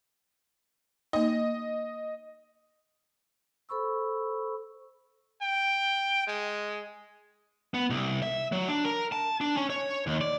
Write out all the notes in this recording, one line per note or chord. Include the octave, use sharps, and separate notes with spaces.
A#3 D#4 D#5
A4 C5 B5 C#6 E6
G5
G#3
B3
C2
E5
F#3
D4
A#4
A5
D4
C#4
C#5
D#2
D5